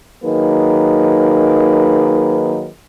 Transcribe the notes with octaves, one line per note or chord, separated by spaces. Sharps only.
D#3 F#3 A#3 D#4 G#4 B4